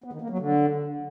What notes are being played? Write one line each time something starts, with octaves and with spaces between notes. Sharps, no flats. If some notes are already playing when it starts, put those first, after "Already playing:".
B3
D#3
A#3
F#3
D3